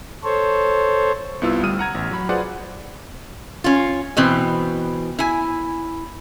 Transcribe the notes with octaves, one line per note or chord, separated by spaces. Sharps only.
A4 C5 C#5
C2 B3 E4 F4 E6
D2 G3 D#6 F6 D#7
F#5 A#5 G#6
A1
F#3 F#4 B5
F4 G#4 B4 C5 D5 F#5
C#4 F4
B2 E3 C4
E4 G#5